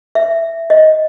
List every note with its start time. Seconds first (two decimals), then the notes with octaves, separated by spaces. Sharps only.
0.15 E5
0.70 D#5